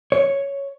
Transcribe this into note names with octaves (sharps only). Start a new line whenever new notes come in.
C#5